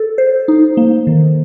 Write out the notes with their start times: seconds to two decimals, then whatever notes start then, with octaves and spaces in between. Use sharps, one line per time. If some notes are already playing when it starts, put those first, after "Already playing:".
Already playing: A4
0.18 C5
0.48 D#4
0.77 A#3
1.07 D#3